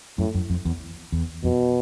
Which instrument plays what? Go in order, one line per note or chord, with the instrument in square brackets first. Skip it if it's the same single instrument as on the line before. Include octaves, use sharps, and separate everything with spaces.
[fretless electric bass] F#2 [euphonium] A2
[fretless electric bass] F#2
F2
E2
E2
[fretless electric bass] F2 [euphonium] B2